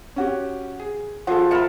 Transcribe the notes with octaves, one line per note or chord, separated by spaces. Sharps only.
C#4 F#4 G4
G#4
F3 F#4 G#4 A4
A#4 E5 A5 B5 C#7